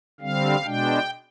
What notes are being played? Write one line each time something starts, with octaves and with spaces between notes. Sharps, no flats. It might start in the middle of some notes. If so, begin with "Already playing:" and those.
D3 G3 C4 F5
B2 G#3 D4 G5